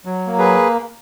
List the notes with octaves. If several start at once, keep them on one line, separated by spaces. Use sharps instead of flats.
F#3
A#3
G#4 B4